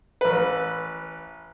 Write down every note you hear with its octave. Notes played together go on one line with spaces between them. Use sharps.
A1 B4